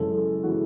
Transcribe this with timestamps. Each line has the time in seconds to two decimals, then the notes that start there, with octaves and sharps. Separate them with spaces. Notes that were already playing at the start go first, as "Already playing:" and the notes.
Already playing: F#2 C#3 E3 G#3 A4
0.43 C#3 E3 G#3 F#4